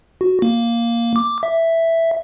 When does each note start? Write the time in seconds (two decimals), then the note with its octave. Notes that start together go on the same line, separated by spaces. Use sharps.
0.21 F#4
0.42 A#3
1.16 D6
1.43 E5